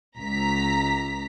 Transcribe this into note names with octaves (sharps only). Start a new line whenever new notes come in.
C#2 A#5 B6